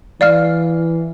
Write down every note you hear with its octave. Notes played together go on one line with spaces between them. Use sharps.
E3 D5 F5 F6